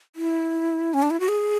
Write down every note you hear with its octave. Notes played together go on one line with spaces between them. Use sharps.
E4
C#4
D4
E4
F#4
G#4